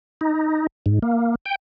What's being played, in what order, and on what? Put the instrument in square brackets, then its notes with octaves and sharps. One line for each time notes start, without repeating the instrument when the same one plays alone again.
[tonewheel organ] D#4
G#2
A#3
G5